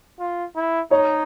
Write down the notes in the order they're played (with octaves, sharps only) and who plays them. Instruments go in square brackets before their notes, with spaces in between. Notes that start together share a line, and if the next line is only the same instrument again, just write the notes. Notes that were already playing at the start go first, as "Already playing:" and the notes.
[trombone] F4
E4
[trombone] D#4 [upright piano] C#5